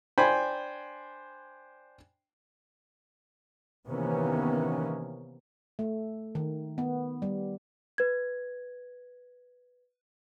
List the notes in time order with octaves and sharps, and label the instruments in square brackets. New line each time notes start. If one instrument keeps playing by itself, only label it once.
[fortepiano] D4 C5 G5 G#5 B5
[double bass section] C3 D#3 E3 A#3 B3 C#4
[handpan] A3
D#3
B3
G3
[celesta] B4 G#6